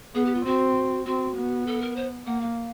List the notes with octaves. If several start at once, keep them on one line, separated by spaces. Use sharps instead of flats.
B3 G#4
G4
F4
C4 F#4
C4 F#4
B3
A4
A#4
C5
A#3 F#5
F5